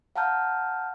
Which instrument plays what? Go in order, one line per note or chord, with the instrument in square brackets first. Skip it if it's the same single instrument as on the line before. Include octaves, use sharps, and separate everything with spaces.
[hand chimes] F5 F#5 A5 A#5 F6 G6